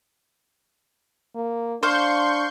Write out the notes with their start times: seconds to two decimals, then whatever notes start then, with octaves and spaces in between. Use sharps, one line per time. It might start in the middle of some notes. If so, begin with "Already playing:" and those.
1.35 A#3
1.83 D4 C5 F5 C6 C#6 G6